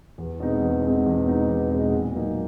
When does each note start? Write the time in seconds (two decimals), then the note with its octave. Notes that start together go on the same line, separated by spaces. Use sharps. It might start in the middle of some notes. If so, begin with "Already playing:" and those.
0.18 E2
0.40 B2 G#3 C4 D#4
0.62 E2
0.83 B2 G#3 C4 D#4
1.06 E2
1.27 B2 G#3 C4 D#4
1.49 E2
1.71 B2 G#3 C4 D#4
1.93 A#2
2.14 F#3 A#3 D#4